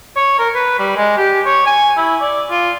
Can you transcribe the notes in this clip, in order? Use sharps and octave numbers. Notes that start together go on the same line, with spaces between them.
C#5
A#4
B4
G3
G#3
G4
C#5
G#5
E4
D5
F4